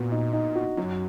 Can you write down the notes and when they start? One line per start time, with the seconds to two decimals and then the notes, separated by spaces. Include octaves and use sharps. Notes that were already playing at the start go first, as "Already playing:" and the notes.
Already playing: A#2 B3 F#4
0.12 D#4
0.33 D#4
0.55 F#4
0.77 F#2 F#3